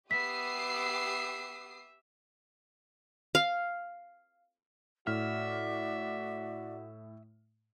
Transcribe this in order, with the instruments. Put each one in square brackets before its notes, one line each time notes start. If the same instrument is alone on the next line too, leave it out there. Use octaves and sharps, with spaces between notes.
[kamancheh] B3 [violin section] G4 D#6 C7 [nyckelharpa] E5 [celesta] B6
[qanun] F5
[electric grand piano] A2 F6 [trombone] F#4 [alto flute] D5 [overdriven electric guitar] E5